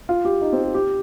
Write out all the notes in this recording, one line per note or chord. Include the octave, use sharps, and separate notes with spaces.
F4
G4
D#4
C4
G4
G4